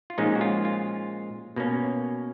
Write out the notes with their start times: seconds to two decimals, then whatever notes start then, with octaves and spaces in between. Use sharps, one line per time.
0.10 F4
0.18 A#2 F3 G#3 C#4 D#4
0.35 F#4
0.41 F4
0.65 F4
1.56 B2 A#3 C#4